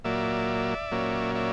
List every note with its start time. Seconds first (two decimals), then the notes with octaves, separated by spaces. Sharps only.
0.04 A#2 F#3 A#3 D5 E5
0.91 A#2 F#3 A#3 C#4
1.35 D5 E5